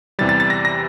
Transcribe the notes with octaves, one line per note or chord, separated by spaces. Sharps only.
E2 C3 E3 G3 A6
A6
A6
A#6
A#6